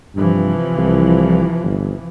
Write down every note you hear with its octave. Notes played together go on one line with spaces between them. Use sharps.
G2 C3 E3 F3
C2
G1